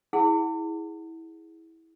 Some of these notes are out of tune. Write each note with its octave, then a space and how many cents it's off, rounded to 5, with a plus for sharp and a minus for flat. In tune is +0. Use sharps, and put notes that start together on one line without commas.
E4 -20 G#4 +0 F#5 +0